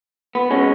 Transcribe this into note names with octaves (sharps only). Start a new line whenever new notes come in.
B3
B2 G#3 C#4